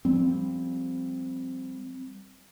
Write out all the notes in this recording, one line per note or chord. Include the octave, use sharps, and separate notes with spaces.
F3 G3 C4